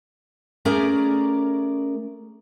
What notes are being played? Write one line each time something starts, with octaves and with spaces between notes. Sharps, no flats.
A3 C#4 G#4 A#4 D5 A#5